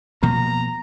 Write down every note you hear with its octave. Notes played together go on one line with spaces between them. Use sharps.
B2 F3 A#3 A#5